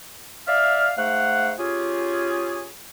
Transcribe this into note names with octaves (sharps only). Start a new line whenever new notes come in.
D5 E5 F5
G#2 A3 F5 F#5
C#4 F4 G4 G#4